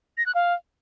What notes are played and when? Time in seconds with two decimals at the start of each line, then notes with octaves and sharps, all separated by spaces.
0.18 A#6
0.26 F#6
0.35 F5